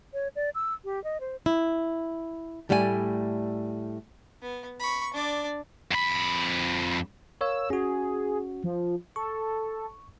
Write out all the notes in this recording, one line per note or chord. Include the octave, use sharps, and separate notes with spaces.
C#5
D5
E6
G4
D#5
C5
E4
A2 G3 A3 D5 F#5 G#5
B3
B5 C#6
D4 D5
F2 B5
A#4 C#5 F5 E6
C#4 F#4 G#4
F3
A4 C#6